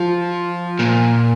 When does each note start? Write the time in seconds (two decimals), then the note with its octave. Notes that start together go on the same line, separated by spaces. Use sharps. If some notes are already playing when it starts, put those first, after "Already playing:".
Already playing: F3
0.79 A#2